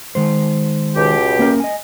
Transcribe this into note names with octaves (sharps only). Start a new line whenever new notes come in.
D#3 G#3 C5
C#2 B2 G4
A#3 C#4 A#4
D#5 G#5